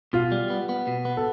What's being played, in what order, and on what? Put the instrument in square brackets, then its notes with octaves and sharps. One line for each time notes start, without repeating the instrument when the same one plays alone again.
[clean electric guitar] B2 [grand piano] F4
[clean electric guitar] G3
B3
B3
B2
B3
[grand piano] A4